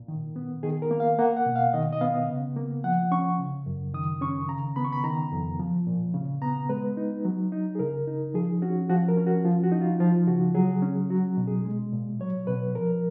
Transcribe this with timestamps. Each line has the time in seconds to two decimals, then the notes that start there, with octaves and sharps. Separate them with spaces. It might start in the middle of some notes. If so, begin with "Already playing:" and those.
Already playing: A#2
0.08 D#3
0.36 B3
0.63 D#3 G#4
0.82 A#4
0.91 A#3
1.00 F5
1.19 A#3 F#5
1.37 F#5
1.46 B2
1.56 F5
1.73 D#3 D#5
1.93 D#5
2.01 B3 F5
2.29 C#3
2.56 A#3
2.84 F3 F#5
3.12 C#4 C#6
3.39 C#3
3.66 F#2
3.94 D#3 D#6
4.21 C#4 C#6
4.49 C#3 A#5
4.76 B3 B5
4.85 C#6
4.92 B5
5.04 D#3 A#5
5.31 F2
5.59 F3
5.87 A#2
6.14 C#3
6.42 B3 A#5
6.69 G#3 B4
6.97 D#4
7.25 F#3
7.52 D#4
7.75 G#4
7.79 C#3 A#4
8.07 D#4
8.34 F3 G#4
8.62 C#4 F#4
8.89 F3 F#4
9.09 A#4
9.17 C#4
9.27 F#4
9.45 F3 F4
9.63 F#4
9.72 D#4
9.81 F4
10.00 F3 F4
10.27 C#3 F#4
10.55 F#3 G#4
10.82 C#4
11.10 F#3 F#4
11.37 B2
11.47 G#4
11.65 G#3
11.93 A#2
12.20 F#3 C#5
12.47 B2 B4
12.75 F3 A#4